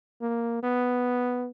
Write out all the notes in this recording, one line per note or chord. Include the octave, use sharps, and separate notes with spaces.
A#3
B3